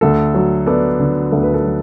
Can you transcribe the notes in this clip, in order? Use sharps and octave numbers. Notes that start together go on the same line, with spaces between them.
D2 A4
F#3
B3 A4 D5
D3
D2 A4
B4
A4
F#3